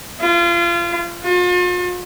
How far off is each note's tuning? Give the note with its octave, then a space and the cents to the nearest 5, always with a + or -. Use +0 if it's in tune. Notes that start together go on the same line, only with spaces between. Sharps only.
F4 -30
F4 +40